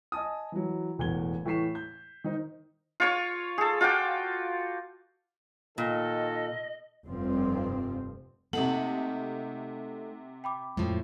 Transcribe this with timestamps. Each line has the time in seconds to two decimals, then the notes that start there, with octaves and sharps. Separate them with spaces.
0.12 D#5 G#5 A5 D#6
0.52 E3 F#3
0.98 E1 E2 A2 G#6 G7
1.45 A2 E3 C#6 B6 C7 E7
1.75 G6
2.24 D#3 D#4 C5
3.00 F4 C#5 C#6
3.58 G#4 A4
3.81 F4 F#4 G5 D6
5.78 A#2 D#3 A4 D#5
7.06 F1 G2 C3 F3 C4
8.53 C3 A3 A#3 D#4 A4 F#5 F#7
10.44 G5 B5 D6
10.77 F2 A2 F3 G#3